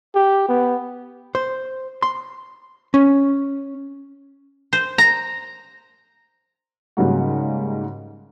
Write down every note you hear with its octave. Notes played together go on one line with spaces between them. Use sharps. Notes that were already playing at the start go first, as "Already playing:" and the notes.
G4
B3
C5
C6
C#4
C5
A#5
G#2 C#3 F#3 G3 A#3 F#4